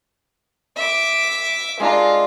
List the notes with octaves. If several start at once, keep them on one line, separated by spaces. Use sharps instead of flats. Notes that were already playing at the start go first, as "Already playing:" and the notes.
E5 D6
G#3 D4 F4 A#5